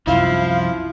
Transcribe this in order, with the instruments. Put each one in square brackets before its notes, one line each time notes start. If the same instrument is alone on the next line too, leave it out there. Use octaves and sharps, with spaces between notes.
[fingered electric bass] C2 F#2 [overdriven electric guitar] F3 [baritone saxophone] E4 [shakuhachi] F5